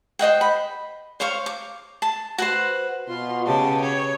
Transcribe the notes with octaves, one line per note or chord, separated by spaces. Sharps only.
C5 D#5 F#5 G5
B5
C5 C#5 F5 C#6
D6
A5
F#4 B4 C5
B2 F4 C6
C#3 G4 A5
C#5